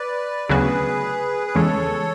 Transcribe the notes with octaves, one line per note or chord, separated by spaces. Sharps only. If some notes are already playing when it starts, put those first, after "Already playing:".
Already playing: B4 D5
D2 C#3 F#3 B3 F#4 G#4 B4
B4
E2 C#3 E3 G#3 A4 C#5